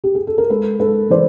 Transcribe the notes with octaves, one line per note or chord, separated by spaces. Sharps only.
G4
G#4
A4
A#4
G#3 A4 B4
G#3 A4 B4
E3 C5 D5